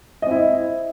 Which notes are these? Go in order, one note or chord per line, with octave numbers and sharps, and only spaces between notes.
C4 E4 D#5